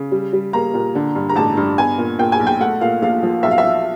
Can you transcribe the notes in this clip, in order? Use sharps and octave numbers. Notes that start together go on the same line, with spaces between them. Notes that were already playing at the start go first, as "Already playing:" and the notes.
Already playing: C#3
G3
G3
A#3 A#5
A#2
D3
G2
A#5
A1 A5
G2
B3 G#5
A#2
A#2 G5
G#5
B1
G5
A3 F#5
A#2 F5
A#1 F5
F3
B1 E5
F5
E5
F3